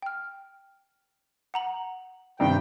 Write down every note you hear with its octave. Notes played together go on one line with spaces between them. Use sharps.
G5 F6
F#5 A#5 F#7
G2 C3 D#3 G5